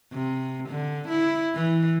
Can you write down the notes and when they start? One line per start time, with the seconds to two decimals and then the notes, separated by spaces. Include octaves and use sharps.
0.13 C3
0.69 D3
1.08 E4
1.55 E3